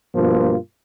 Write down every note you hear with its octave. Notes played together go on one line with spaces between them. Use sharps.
G2 B2 F3 A#3 F4